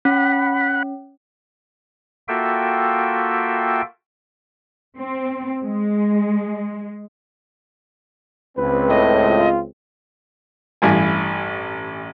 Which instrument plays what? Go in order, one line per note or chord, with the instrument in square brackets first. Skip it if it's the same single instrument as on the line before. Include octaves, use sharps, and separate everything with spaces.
[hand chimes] C#4 [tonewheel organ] F#5 B5
[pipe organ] A#3 F4 F#4 A4 E5 G5
[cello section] C4
G#3
[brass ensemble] C#2 C4 [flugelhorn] B4
[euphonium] A2 [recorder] D#5
[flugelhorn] F4
[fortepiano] A1 G2 E3 E4 F5 G#5